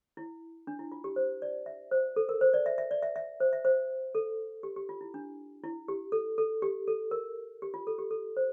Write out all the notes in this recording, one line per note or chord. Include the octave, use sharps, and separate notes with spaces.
E4
D4
E4
F4
G4
C5
D5
E5
C5
A4
A#4
C5
D5
E5
E5
D5
E5
E5
C5
E5
C5
A4
G4
G4
F4
E4
D4
E4
G4
A4
A4
G4
A4
A#4
G4
F4
A4
G4
A4
C5